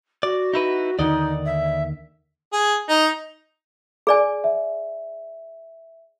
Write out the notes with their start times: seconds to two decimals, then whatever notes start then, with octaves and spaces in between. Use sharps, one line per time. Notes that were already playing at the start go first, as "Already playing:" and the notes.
0.23 F#4 D5
0.53 D#4 E4 B4
0.99 D#2 D3 D#3 D#4 D5 D#5
1.46 E5
2.53 G#4
2.89 D#4
4.07 G#4 D5 G#5
4.44 E5